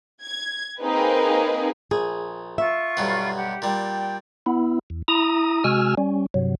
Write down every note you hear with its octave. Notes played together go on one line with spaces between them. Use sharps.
G#6
A#3 C4 D#4 G#4 B4
A#1 G#4
F4 E5 C#6
B1 G2 B3
G4 F#5
A#2 G3 G5
B3 E4
E2
E4 A#5 D#6
C3 G#3 F#4 G#5 E6 F6
G3 C#4
G2 C3 F#3